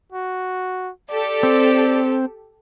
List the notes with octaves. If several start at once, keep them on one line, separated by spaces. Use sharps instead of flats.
F#4
G4 A4 D5
C4